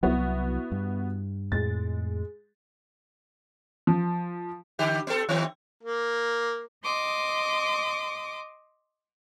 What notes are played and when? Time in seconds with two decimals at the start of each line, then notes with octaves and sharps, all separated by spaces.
0.03 C2 F#3 B3 E4 F#4
0.72 G2
1.52 F2 A2 G#3 A6
3.87 F3
4.79 D3 G4
5.07 B3 A4
5.29 D#3 B3 C4
5.83 A#3
6.84 D#5 C6 D6 D#6